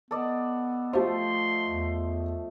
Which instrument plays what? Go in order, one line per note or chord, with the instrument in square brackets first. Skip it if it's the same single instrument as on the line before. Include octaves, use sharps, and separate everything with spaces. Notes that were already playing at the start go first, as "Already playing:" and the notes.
[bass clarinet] B3 [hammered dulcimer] A4 D5 D#5
[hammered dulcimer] F3 A3 [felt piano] G4 C5 [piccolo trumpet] C6
[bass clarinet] E2